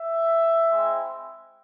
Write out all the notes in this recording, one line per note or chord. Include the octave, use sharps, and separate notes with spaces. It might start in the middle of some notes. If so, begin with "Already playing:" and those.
Already playing: E5
G#3 C4 E4